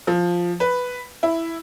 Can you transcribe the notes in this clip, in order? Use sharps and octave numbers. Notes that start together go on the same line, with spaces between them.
F3
B4
E4